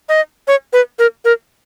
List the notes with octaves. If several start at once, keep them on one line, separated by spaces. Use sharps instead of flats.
D#5
C#5
B4
A#4
A#4